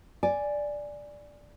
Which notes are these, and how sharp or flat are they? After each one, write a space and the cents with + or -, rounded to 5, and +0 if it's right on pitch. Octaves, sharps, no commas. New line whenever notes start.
D5 +0 G#5 +0